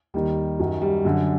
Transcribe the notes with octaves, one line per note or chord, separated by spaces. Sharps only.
D#2 D#3 G3
F#2 D#3 F#3
G3
F#2 D3